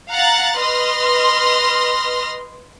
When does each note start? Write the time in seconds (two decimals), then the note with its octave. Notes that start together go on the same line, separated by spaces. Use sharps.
0.10 F5 F#5 A#5 F#6 A6
0.58 B4 D#5 C6 F6 A#6